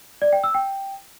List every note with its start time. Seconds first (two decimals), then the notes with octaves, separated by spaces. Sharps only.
0.22 D5
0.33 G5
0.44 E6
0.55 G5